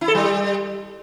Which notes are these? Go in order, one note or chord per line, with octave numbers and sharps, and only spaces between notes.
E4
A4
G3